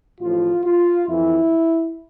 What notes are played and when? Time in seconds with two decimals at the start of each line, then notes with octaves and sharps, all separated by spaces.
0.21 A1 A2 F3 F4
0.65 F4
1.08 F2 E3 E4